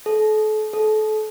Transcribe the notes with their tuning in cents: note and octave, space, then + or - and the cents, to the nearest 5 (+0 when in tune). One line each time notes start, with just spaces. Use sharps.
A4 -35
A4 -30